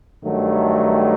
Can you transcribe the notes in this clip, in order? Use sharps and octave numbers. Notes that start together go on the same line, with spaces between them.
G2 D#3 F#3 A3